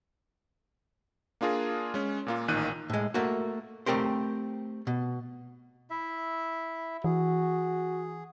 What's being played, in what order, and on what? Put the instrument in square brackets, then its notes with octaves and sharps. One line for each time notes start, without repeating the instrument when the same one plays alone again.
[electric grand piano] A#3 D4 F4 G#4 A#4
G#3 C#4
A#2 A#3 F4
A1 A#2 D#3 F#6 D#7
[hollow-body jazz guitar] A2 G#3
A3 A#3 F#4
A3 C4 G4 A#4 C5
B2
[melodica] E4 E5
[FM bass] E3 [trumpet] F#4 [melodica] G#4